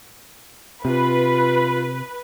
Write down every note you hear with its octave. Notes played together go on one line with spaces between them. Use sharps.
C3 F4 B4